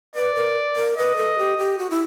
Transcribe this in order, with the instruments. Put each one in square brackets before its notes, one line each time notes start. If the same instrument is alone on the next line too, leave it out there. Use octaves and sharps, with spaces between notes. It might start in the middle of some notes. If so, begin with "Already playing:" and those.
[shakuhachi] B4 [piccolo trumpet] D5
[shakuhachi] A#4
A#4
[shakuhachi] B4 [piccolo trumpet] D#5
[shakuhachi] A4
G4
G4
F#4
E4